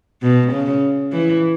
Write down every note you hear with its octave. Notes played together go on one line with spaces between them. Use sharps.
B2
C#3
E3